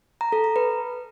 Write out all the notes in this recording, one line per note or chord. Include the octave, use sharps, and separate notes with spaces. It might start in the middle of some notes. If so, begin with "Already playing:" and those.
A#5
A4
A#5
B4